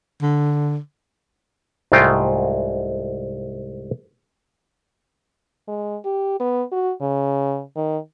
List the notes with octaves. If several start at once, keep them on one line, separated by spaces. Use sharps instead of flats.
D3
C2 G#2 G#3 A3 F4 G5
G#3
G4
B3
F#4
C#3
D#3